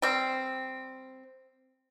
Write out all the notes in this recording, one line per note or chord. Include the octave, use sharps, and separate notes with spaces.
G3 C4